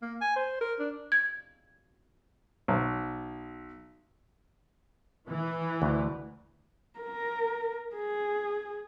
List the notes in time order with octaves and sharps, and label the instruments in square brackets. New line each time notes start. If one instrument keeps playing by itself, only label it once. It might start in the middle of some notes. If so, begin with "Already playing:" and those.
[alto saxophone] A#3
G#5
C5
A#4
D4
[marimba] G#6
[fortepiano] B1
[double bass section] E3
[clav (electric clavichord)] D2
[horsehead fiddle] A#4
G#4